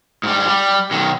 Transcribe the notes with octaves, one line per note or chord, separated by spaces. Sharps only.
G#2 G3
G3
B1 D#3